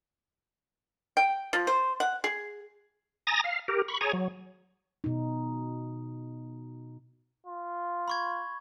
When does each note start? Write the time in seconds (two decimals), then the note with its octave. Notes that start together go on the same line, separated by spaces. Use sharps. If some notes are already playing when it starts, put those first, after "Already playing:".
1.17 G5
1.53 F3
1.67 C5
2.00 F#5
2.24 G#4
3.27 G#5 A#5 D#6 A6 A#6
3.44 F5
3.68 G4 A#4
3.88 B5 C#6
4.01 G#4 C#5 G#5 A#5
4.13 F#3
5.04 B2 D#4
7.46 F4
8.08 B5 C#6 G#6